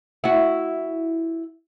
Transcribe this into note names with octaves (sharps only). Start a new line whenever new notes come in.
E4 F#4